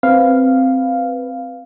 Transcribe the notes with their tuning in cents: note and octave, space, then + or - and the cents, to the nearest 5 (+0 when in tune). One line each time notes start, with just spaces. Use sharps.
C4 +0 B4 +0 F5 +0